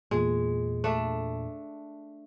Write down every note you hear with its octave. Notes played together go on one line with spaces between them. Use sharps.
E2 A#2 G#3
A3 D4